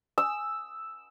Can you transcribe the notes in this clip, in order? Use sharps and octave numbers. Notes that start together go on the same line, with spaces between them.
E6